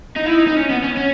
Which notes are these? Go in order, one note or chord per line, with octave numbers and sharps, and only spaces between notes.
D#4
E4
D#4
D#4
C#4
B3
C#4
C#4